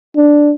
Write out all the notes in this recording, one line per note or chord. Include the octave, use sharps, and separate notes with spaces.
D4